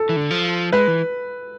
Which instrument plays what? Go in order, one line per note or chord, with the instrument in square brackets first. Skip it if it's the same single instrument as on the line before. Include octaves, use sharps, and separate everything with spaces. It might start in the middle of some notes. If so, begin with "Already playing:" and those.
Already playing: [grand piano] A4
[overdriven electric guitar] E3
D3
F3
[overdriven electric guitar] G#3 [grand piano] B4
[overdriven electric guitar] E3